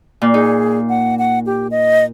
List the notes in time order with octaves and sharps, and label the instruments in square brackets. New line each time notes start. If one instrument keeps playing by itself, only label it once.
[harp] A#2
[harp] D#4 [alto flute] G#4
[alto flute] F#5
F#5
G4
D#5